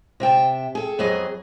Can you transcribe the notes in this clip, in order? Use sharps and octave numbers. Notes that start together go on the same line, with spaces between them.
C3 E5 G5 A5
G#4 A4
F2 F#3 B3 G#4 D#5